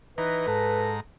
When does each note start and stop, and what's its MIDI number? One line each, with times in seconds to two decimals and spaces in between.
0.18 0.47 52
0.18 0.47 63
0.18 0.90 71
0.18 0.47 82
0.47 1.00 44
0.47 0.96 69
0.47 1.00 82